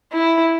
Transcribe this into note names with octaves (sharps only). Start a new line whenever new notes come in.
E4